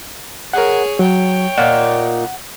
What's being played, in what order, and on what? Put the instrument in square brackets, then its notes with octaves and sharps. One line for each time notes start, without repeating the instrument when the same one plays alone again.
[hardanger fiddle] G#4 C#5 [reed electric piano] A#4 F#5
[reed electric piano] F#3 [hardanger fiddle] C#5 G5
[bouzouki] A#2 D#4 [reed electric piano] F#5